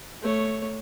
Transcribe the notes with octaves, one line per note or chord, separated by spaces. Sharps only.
A3 C#5